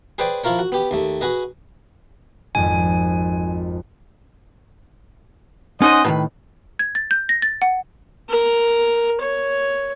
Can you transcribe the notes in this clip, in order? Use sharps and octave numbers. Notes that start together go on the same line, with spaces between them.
G#4 B4 C5 D5 G5 G#5
F3 E4 F4 A#4 C#5
F#4
B3 G4
D#2 A3
F#4 G#4 B4 D#5
G#1 F2 G#5
C#4 D#4 C5 D#5 F#5 G#5
A2 C3 D#3 B4
G#6
A6
G6
A#6
A6
F#5
A#4
C#5